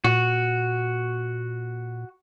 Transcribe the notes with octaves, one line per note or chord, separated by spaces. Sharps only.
A#2 F#4